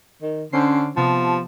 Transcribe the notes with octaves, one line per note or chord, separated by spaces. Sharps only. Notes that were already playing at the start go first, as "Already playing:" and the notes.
D#3
D3 C#4 C5 C7
C3 F3 B3 A5